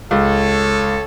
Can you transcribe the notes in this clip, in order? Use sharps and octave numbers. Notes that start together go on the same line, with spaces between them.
C#2 A4 C#5